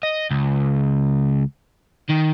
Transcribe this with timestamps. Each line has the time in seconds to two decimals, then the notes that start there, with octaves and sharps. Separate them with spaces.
0.03 D#5
0.31 C#2
2.09 D#3